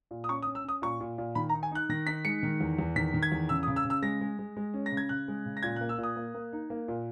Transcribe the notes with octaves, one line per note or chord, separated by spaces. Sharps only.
A#2
D#6
C#4 C#6
D#6
C#4
E6
C#4 D#6
A#2 C#6
A#2
A#2
D#3 B5
A#5
D#4
G#5
D#4 F#6
D#3 A#6
D#4 B6
G#3 C#7
D#3
E2
E2
D#3 B6
D#3
G#6
E2
C#3 E6
D#6
C#3
E6
C#3
E6
G#3 A#6
G#3
G#3
G#3
C#4
A#6
C#3
G#6
C#3 F#6
G#3
C#3
A#6
A#2 G#6
F#6
A#3
E6
A#2
D#6
A#3
A#3
D#4
A#3
A#2